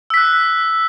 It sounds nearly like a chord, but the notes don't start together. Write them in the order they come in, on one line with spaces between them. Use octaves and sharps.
E6 B6 F#6